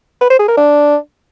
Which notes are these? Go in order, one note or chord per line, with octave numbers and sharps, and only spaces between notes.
B4
C5
G#4
A#4
D4